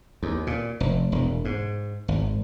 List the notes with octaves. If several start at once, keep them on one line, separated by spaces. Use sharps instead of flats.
D#2
A#2
F1
E1
G#2
G#1